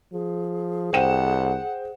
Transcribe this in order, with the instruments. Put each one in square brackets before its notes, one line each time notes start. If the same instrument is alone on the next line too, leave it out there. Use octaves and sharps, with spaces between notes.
[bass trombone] F3 [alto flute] G#4
[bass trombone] C2 [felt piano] C5 G5 E7 [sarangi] F#5